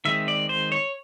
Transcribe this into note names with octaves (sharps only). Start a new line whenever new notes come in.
D#3 G#3 C4 E5
D5
C5
C#5